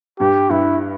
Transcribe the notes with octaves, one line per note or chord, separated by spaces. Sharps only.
G2 G4
G2 E4